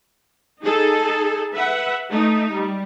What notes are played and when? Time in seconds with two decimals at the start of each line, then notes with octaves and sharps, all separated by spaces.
0.63 D#4 G#4 A4
1.53 B4 E5 F#5
2.11 A3 D#4
2.51 G3